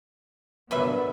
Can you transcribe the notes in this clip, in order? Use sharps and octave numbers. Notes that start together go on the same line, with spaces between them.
D3 F#3 A#3 B3 B4 E5